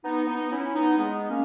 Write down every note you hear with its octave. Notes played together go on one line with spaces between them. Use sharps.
B3 D#4
B3 D#4
C#4 E4
B3 D#4
G#3 B3
A#3 C#4